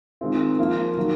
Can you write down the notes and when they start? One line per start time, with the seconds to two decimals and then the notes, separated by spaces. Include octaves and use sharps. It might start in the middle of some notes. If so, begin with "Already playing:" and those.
0.21 D#3 G#3 C4 F4
0.58 F3 A#3 F4
0.97 D#3 F#3 A#3